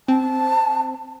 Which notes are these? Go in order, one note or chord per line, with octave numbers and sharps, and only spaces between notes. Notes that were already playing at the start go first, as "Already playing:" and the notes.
C4 A5